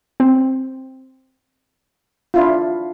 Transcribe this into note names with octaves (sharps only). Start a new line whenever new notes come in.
C4
D4 E4 F4